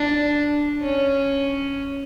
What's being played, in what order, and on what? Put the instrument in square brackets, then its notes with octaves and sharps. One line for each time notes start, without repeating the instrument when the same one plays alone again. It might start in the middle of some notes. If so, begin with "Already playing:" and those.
Already playing: [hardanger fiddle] D4
C#4